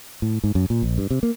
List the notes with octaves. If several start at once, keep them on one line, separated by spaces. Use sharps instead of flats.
A2
G#2
F#2
A#2
A#1
G2
C3
A#3